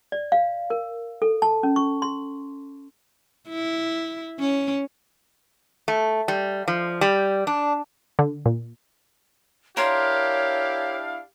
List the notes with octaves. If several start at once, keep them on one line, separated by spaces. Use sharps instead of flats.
D5
F5
A#4
A4
A5
C#4
C#6
C6
E4
C#4
A3
G3
F3
G3
D4
D3
A#2
D4 E4 G4 A#4 C#5 F5 C6